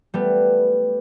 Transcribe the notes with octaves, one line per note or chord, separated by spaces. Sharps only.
G3 A3 B3